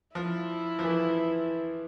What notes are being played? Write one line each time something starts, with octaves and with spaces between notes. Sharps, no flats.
F3 E4
F3
E3